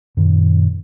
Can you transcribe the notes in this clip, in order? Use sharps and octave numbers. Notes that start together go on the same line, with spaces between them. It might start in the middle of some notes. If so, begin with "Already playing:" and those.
F#2 A#2 D#3